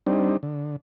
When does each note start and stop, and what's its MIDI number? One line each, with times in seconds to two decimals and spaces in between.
0.07 0.37 55
0.07 0.37 60
0.07 0.37 62
0.07 0.37 63
0.43 0.76 50